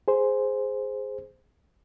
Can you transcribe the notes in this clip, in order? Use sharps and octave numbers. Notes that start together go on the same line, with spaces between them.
G#4 C5